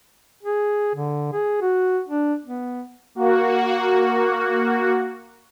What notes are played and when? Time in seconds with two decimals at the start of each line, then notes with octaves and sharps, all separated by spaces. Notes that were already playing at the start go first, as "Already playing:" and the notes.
0.43 G#4
0.95 D3
1.33 G#4
1.62 F#4
2.08 D4
2.46 B3
3.15 A#3 F#4